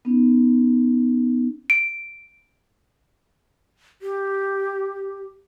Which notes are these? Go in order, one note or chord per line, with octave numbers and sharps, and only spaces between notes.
B3 C#4 D#4
D7
G4